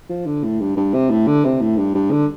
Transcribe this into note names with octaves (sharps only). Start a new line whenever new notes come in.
F3
D3
A2
G2
G2
C3
A2
D3
C3
A2
G2
G2
D3